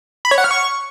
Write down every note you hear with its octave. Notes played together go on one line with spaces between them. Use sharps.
B5
C#5
F#5
F6
C#6